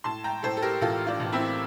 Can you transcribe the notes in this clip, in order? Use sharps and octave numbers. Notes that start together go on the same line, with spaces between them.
A2 A5 C6
G5 A#5
A2 A4 C5
A4
G4 A#4
A1 F4 A4
D4 F4
A1
C4 E4